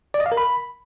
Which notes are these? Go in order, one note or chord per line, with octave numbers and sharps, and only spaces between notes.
D5
D#5
F5
A#4
B5